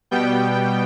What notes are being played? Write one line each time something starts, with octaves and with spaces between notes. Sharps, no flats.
B2 G3 B3 G5